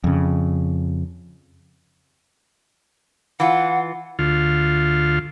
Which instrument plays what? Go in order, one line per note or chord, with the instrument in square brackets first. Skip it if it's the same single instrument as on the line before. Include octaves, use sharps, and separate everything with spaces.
[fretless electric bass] F2 C#3
[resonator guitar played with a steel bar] E3 F4 [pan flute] F#5
[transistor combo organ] D2 F4